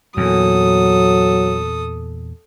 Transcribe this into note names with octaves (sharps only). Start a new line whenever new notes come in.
E2 A#2 F#3 A4 D#6